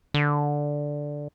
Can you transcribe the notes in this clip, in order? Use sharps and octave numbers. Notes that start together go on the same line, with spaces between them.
D3